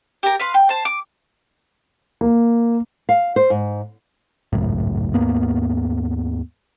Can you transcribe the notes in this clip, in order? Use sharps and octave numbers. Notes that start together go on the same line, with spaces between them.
G4 A#4
B4 F5 C6
G5
C5 A5
D6
A#3
F5
C5
G#2
G#1 C#2 F#2 A2
D#2 G#2 A#3 B3